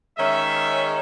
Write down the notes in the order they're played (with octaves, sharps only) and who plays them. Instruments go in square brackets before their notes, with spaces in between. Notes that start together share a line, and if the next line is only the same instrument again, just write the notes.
[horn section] D#3 G#3 C#4 E5